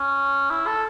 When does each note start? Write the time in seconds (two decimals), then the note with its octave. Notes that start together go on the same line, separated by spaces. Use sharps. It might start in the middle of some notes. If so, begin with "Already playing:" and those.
Already playing: C#4
0.51 E4
0.67 A4